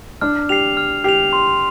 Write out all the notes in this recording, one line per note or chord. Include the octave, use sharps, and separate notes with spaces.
D4 F6
G4 C7 F7
F6
G4 C7 F7
C6